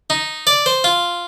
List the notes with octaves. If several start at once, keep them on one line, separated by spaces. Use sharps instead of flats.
D#4
D5
C5
F4